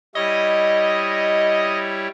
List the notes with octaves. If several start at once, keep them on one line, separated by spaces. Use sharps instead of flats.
G3 E4 C#5 D#5